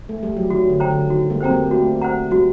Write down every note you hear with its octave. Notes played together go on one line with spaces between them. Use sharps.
A3
G3
F#3
D#3 F#4
D3
C5 G5 A#5
D3
D#3 F#4
G3 A#3
C4 C5 G5 A#5
G3 A#3
A3 F#4
C5 F#5 A#5
G3 F#4